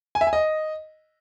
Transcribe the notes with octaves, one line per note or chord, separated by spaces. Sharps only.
G#5
E5
G#5
D#5